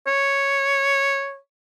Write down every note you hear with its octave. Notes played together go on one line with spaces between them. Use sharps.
C#5